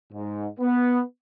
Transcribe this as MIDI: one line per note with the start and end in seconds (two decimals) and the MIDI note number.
0.13 0.47 44
0.60 1.01 59